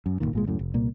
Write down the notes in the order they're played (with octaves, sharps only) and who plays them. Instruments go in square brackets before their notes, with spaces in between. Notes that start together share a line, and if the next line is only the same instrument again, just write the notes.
[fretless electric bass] F#2
F#1 C2 A#2 D#3
G#1 A#2 G#3
C#2 F#2 A2
F1
C2 A#2 A#3